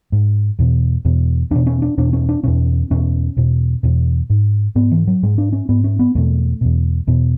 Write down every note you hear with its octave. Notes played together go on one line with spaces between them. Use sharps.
G#2
E2 B2
E2 B2
E2 B2 D4
C#4
D4
E2 B2 D4
C#4
D4
E2 B2 C#4
E2 B2 C#4
E2 B2
E2 B2
G#2
G#2 B3
E3
F#3
G#2 G#3
D4
C#4
G#2 B3
C#4
B3
E2 B2 A3
E2 B2
E2 B2